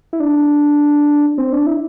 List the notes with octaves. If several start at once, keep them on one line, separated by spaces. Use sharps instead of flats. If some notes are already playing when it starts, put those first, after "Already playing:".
E4
D4
C4
D4
E4